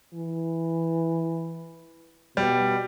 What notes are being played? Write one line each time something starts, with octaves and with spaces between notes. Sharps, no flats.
E3
B2 G3